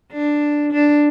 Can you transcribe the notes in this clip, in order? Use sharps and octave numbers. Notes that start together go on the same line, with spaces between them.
D4
D4